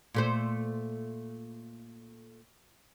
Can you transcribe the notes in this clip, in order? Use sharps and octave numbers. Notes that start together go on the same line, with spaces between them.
A#2 A3 C5